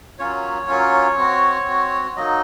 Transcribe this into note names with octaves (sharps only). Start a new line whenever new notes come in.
F#3 A#3 C#4 F4 C#5
F#3 A#3 C#4 F4
C4 F#4
C4 F#4
F#3 A#3 D#4 D#5